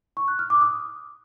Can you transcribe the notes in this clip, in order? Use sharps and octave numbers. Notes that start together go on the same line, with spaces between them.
C#6
F#6
F6
D6
D#6